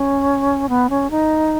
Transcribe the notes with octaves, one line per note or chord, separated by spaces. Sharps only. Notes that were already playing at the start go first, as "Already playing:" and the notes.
Already playing: C#4
B3
C#4
D#4